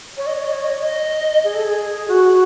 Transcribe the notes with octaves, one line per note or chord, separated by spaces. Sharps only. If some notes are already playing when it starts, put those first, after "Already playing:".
C#5
D#5
C#5
D#5
C#5
D#5
C#5
D#5
G#4
A4
G#4
F#4